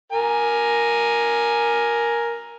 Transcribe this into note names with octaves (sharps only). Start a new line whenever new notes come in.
A#4 G#5